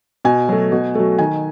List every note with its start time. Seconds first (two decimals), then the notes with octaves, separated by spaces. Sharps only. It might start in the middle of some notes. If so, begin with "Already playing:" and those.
0.25 B2 G#5
0.49 F#3 A3
0.72 B2
0.95 F#3 A3
1.19 D#3 G#5